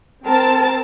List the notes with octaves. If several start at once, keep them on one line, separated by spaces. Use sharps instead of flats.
C4 A#4 A5